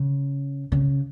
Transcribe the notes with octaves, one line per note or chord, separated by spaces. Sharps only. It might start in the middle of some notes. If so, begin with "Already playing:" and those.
Already playing: C#3
C#3